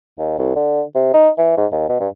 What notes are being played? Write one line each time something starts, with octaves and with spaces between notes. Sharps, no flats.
D#2
C2
D3
C3
D#4
E3
G#2
D#2
B2
G2